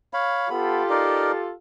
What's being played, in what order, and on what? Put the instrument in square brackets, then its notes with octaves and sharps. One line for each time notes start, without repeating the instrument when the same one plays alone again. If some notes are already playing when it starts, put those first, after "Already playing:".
[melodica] C#5 F5 B5
[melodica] B3 B5 [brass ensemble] F4 G4 A4
[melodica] D#4 A#4 D5